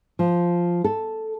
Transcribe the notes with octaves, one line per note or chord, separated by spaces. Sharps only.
F3
A4